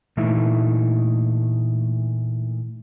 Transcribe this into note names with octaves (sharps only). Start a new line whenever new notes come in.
A#2 E3 A3 D#4 E4